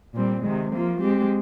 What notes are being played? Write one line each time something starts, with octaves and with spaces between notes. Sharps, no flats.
A#2 G3 C4
C3 D#3 G#3
F3 A#3 F4
G#3 C4 G4